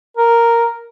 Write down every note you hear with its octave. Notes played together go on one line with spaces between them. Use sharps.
A#4